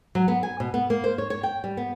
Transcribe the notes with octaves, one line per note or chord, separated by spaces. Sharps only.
F#3
B3
G#5
B2
B3
A#3
C5
C#5
C#5
G5
G3
B3